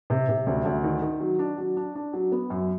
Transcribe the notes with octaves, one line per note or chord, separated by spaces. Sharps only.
C3
C3
D2
D2
D#3
D#3
F#3
D4
F#3
D4
D4
F#3
B3
F#2